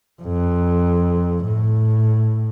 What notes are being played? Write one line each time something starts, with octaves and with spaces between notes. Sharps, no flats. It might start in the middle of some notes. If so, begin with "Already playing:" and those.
F2
A2